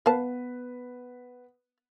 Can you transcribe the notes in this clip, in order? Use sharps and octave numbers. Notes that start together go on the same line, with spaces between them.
B3 A#4 B4 F5 A5